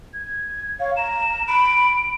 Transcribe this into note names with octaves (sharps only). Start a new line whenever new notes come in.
G#6
C#5 F5
A#5 E7
B5 D7